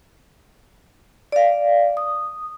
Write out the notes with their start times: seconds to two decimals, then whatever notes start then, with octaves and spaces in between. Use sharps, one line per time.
1.32 D5 F5
1.97 D#6